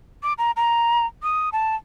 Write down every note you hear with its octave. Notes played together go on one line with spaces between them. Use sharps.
D6
A#5
A#5
D#6
A5